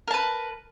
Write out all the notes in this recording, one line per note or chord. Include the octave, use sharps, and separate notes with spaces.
A#4 B4 A5